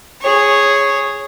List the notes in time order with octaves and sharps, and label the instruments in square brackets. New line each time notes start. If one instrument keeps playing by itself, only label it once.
[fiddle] G#4 C#5